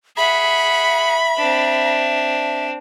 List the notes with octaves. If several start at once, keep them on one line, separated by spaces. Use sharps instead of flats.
G#4 E5 F#5 B5
C4 D4